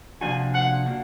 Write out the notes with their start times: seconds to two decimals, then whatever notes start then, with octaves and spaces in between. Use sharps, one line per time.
0.21 C3 F3 A#3 D4 F#4 G#5
0.54 F#5
0.86 A#3 D4 F#4